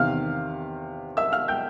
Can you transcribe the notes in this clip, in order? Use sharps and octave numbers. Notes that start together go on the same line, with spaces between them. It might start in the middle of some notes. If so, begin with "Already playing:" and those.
Already playing: E2 C3 D#3 F5 F6
E5 E6
F5 F6
G5 G6